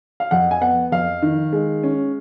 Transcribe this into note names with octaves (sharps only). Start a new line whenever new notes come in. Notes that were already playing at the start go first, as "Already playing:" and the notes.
F5
F2 F#5
G#5
B3 F#5
F2 F5
D#3
G#3
C#4